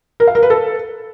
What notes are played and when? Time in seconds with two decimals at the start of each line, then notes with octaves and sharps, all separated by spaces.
0.20 A#4
0.27 F5
0.35 A#4
0.43 B4
0.50 A4